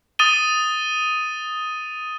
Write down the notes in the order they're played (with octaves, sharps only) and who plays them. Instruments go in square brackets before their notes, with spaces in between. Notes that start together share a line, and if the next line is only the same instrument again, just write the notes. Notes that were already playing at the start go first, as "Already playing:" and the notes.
[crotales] D#6 A6 D#7 G7